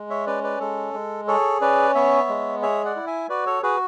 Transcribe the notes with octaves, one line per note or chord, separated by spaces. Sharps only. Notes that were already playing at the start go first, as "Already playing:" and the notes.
Already playing: G#3
C#5 E5
C#4 B4 D5
B4 D5
G#3 A4
G#3
G#4 A4 C#5
C#4 B4 D5
B3 C#5 E5
G#3
G#4 C#5 E5
D5 F#5
E4
E5 G#5
F#4 B4 D5
A4 C#5
F#4 G#4 B4